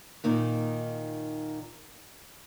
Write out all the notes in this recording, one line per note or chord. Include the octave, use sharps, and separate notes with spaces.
A#2 D#3 A#3 D#4